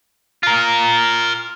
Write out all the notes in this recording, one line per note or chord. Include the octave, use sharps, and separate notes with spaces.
F4 A#4